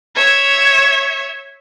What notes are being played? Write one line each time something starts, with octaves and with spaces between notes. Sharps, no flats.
C#5 E5